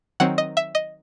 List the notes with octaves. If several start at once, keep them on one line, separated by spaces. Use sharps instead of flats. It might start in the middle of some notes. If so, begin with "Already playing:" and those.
D#3 F#3 C4 F#5
D#5
E5
D#5